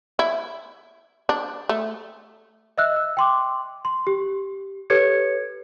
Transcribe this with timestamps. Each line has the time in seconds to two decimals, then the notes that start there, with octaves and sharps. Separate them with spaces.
0.19 E4
1.29 D4
1.69 A3
2.78 D#5 E5 E6 F#6
2.96 E6
3.17 G5 C6 D6
3.85 C6
4.07 G4
4.90 G4 A4 B4 C#5 G#6 C#7